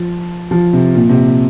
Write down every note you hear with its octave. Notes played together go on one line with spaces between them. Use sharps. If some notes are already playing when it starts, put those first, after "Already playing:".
Already playing: F3
F3
C3
A#2
C3